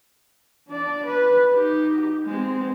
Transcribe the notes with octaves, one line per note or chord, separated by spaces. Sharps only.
D4 D5
B4
D#4 G4
G#3 C4